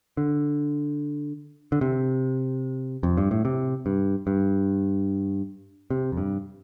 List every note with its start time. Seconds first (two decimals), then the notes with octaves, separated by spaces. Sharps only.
0.17 D3
1.72 D3
1.81 C3
3.03 F2
3.17 G2
3.31 A2
3.45 C3
3.86 G2
4.27 G2
5.90 C3
6.12 F2
6.17 G2